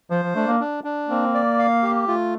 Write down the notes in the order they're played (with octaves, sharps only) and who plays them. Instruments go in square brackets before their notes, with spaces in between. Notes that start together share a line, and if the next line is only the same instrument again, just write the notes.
[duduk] F3 [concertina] C5
[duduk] F3
[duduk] A3 [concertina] D4
[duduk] A#3
[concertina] D4
D4
[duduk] A#3 [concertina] C4
[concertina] D5
F5
G4
[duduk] A3 [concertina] F4